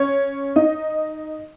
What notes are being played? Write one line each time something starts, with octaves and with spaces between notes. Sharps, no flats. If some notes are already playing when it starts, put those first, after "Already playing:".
Already playing: C#4 C#5
D#4 D#5